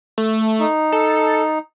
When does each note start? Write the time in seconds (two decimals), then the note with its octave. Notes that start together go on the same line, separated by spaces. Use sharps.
0.18 A3
0.59 D#4
0.92 A4